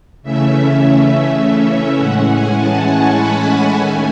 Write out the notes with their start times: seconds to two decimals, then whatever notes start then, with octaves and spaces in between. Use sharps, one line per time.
0.23 C#3 E3 A3 C#4 E5
1.97 A2 E3 G#3 C#4 F#5
2.27 G#5
2.56 A5
2.85 C#6
3.15 B5
3.43 A5
3.72 D#3 A3 C#4 G#5